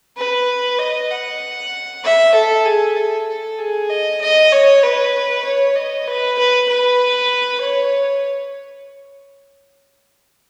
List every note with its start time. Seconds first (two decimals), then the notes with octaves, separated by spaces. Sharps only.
0.17 B4
0.79 D#5
1.11 F#5
2.04 E5
2.34 A4
2.65 G#4
2.96 A4
3.27 A4
3.58 G#4
3.89 D#5
4.21 D#5
4.52 C#5
4.83 B4
5.45 C#5
5.75 D#5
6.08 B4
6.39 B4
6.68 B4
7.62 C#5